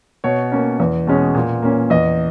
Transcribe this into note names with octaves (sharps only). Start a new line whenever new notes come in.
B2 C#5
A#3 C#4
E2
B2 G#3 C#4
A#2
A#3 C#4
E2 D#5